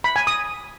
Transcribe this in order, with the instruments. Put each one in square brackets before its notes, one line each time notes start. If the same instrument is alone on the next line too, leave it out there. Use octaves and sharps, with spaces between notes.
[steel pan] B5
G#5
D#6